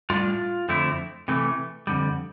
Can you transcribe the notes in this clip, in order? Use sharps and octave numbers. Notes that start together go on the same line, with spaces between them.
A2 G3 D4 F4
F2 D3 A3 C4 E4
C3 E3 A3
F2 D3 G3